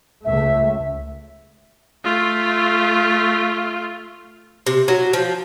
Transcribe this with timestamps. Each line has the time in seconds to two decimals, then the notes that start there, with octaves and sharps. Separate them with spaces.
0.25 C#2 A3 E5
2.04 A3 F4
4.67 C3
4.88 F#3
5.13 F3